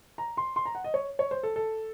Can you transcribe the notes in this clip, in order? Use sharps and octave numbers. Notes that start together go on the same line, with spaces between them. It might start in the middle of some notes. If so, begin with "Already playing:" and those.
A#5
C6
C6
A#5
F#5
D#5
C#5
C#5
C5
A4
A4